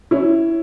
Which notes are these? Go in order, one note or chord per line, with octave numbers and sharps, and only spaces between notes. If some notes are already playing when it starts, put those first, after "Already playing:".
C#4 E4